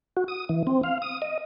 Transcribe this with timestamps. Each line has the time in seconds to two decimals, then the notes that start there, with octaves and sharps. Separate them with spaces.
0.17 F#4
0.28 D#6
0.49 E3
0.67 C4
0.84 F5
1.02 D#6
1.22 D#5